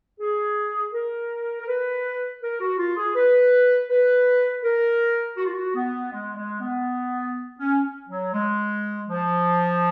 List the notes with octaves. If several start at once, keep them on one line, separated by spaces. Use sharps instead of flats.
G#4
A#4
A#4
B4
A#4
F#4
F4
G#4
B4
B4
A#4
F#4
F4
F#4
B3
G#3
G#3
B3
C#4
F#3
G#3
F3